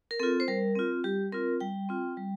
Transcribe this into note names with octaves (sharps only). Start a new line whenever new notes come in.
A#4
C4 F4 A4
C5
G3 A#4
C4 F4
G3 G4
C4 F4 A#4
G3 G5
C4 F4
G3